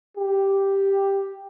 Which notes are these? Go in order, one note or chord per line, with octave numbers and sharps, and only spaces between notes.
G4